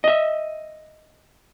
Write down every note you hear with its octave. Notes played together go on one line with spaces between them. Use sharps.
D#5 E5